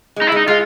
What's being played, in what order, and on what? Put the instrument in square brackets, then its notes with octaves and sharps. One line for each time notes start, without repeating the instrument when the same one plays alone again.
[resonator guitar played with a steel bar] G#3
[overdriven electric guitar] D#4
E4
[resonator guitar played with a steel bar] G#3 [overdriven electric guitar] D#4
[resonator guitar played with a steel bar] G#3 [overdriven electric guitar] F4